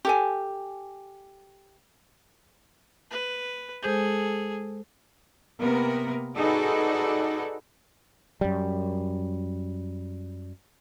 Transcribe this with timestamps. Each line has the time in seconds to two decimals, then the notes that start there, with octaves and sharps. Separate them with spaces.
0.05 G4 A4 G#5
3.11 B4
3.83 G#3 G#4 A4 C5 G6
5.60 C3 A#3 B3 A#4
6.36 D#4 F#4 G#4 A4 B4 D5
8.41 F#2 G3